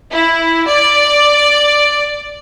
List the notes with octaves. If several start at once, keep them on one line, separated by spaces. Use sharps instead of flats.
E4
D5